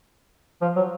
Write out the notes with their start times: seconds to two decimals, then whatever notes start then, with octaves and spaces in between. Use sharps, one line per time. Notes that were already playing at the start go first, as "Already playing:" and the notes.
0.61 F3
0.76 F#3